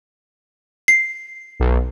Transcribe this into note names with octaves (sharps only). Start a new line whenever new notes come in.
C7
B1